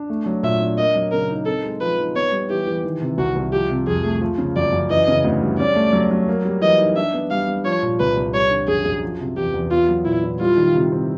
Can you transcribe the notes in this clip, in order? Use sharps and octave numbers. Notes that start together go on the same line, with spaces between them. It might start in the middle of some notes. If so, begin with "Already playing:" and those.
Already playing: D4
A3
F#3
A#2 E5
D4
A#3 D#5
F#3
C#3 A#4
D#4
C4 A4
G#3
F3 B4
D#4
B3 C#5
G3
E3 G4
E3
D#3
C3
C2 F#4
C2
F3 G4
C3
F2 G#4
A3
F3
C#3
F#2 D5
F#2
E3 D#5
C#3
D2
G3
C#4 D5
A3
F#3
F#3
A#3
G3
E3 D#5
D#4
D4 E5
B3
G3 F5
G3
F3 C#5
A#2
C2 B4
C2
G3 C#5
D3
F#2 G#4
F#2
F3
C3
E2 G4
E2
B3 F4
F#3
A#2 E4
E4
G3 F4
D#3
C3
C4